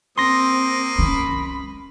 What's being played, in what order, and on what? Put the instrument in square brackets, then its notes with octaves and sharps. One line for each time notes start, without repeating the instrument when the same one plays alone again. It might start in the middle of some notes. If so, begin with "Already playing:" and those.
[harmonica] A#3 D#6 [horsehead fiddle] C4 [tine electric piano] C6 A#6
[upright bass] G#3 C#4 [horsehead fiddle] B5